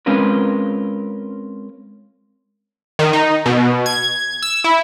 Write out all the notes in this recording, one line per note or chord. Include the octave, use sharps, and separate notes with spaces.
G#3 C4 C#4 F4 A#4 B4
D#3
D#4
B2
G#6
E6
E4